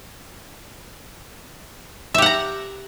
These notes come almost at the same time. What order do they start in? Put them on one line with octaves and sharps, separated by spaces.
E5 G4 F#5 A#5